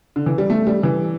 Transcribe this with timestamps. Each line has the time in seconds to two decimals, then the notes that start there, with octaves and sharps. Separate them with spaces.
0.16 D3
0.26 E3
0.38 G3
0.50 A3
0.67 G3
0.83 E3